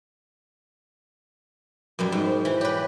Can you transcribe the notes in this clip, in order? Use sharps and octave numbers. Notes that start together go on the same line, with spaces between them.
F#2 B2 G3
G#2
C5
E3
G4 B4 C#5